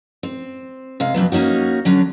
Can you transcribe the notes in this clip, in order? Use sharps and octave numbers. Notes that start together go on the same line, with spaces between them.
C4
C3 G#3 F5
F2 G#2 F#3 B3
A#3 C#4 D#4 F#4
D3 F#3 C#4